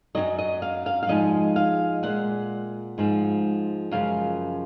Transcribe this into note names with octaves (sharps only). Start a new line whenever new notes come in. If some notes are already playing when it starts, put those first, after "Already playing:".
F#2 D#3 F#3 D#5
D#5
F5
F5
F5
G#2 F3 G#3 D#5
F5
A#2 G#3 F#5
G#2 F3 G#3
F#2 C#3 F3 G#3 F5